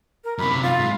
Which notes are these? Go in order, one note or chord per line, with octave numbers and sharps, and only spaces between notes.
A#4
F#2 C3 B5
F4
G#2